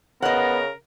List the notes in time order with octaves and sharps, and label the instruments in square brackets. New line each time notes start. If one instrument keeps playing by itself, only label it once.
[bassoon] C#3 [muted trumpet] B3 [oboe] A#4 [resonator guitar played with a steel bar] D#5 F#5